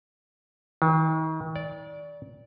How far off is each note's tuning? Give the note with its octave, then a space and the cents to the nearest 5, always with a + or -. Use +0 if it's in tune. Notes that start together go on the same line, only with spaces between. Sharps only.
D#3 +40
D5 -15